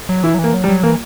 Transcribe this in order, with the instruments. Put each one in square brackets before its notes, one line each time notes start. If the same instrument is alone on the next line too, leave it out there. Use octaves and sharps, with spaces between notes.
[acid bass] F#3
[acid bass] E3 [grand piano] E4
[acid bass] F#3
E3
[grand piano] A#3
[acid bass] F#3
[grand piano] G3
[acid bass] F#3
[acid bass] E3 [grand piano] A#3